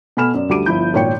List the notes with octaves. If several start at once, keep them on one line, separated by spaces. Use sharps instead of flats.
B2 A4 G#5 B5 F6 E7
F#2 D5
D2 G3 F#4 D6 D7 D#7
G1 F3 E4 G6
G#1 A#2 C#5 G5 C#7